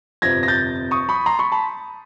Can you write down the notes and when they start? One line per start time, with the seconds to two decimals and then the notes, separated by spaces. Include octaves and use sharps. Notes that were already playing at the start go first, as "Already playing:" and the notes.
0.22 G1 F2 C3 F3 G#6 A#6
0.43 A#6
0.48 G6 A6
0.91 C#6 D#6
1.09 B5 C#6
1.26 A#5 C6
1.39 B5 C#6
1.52 A5 B5